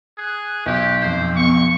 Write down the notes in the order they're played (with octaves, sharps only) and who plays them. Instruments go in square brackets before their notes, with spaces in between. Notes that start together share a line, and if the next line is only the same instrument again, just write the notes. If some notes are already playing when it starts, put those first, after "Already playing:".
[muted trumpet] G#4 [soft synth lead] F#6
[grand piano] B1 [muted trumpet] G4
[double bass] F2 F3 [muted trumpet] C5
[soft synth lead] B3 [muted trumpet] C#6